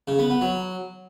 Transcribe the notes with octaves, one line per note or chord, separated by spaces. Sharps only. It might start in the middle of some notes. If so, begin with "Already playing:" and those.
C#3
B3
B3
F#3